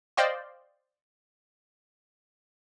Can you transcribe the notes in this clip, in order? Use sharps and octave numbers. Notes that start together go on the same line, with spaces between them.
C5 D5 D#5 F5 G5 C6